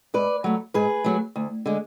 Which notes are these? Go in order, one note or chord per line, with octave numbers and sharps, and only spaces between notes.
G#2 B4 D5
F#3 A3
G#2 G#4 B4
F#3 A3
D2
D3 G#3